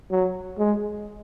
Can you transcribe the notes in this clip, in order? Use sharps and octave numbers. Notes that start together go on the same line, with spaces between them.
F#3
G#3